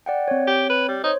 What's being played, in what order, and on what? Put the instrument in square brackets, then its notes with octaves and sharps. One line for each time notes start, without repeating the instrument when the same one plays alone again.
[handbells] D5 F#5 G5
C4 C#5
[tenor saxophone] G4
B4
G3
[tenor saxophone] D#4 [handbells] C5 C#5